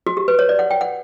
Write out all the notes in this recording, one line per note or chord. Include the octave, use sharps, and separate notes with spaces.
F#4
G4
B4
C#5
D5
F#5
G5
F#5